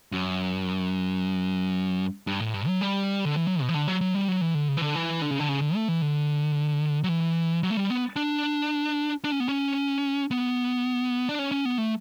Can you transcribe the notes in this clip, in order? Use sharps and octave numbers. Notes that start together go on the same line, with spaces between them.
F#2
G2
A2
G2
F#3
G3
D3
E3
F#3
B2
E3
D3
F#3
F#3
G3
F#3
E3
D3
C#3
E3
D3
E3
D3
C#3
D3
C#3
D3
A3
E3
D3
F#3
E3
F#3
A3
G3
B3
D4
D4
C#4
B3
C#4
B3
D4
C#4
C#4
B3
A3